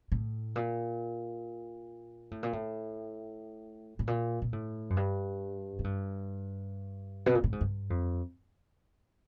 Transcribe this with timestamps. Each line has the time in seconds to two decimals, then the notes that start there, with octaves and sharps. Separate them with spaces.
0.12 A2
0.56 A#2
2.31 A2
2.43 A#2
2.53 A2
3.99 A2
4.08 A#2
4.42 A#2
4.53 A2
4.90 F#2
4.97 G2
5.79 G#2
5.84 G2
7.26 B2
7.35 A#2
7.44 A2
7.52 G#2
7.61 G2
7.90 F2